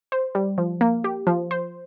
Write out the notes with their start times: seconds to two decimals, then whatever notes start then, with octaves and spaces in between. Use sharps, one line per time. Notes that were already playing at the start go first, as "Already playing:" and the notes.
0.12 C5
0.35 G3
0.58 F3
0.81 A#3
1.04 G4
1.27 F3
1.51 C5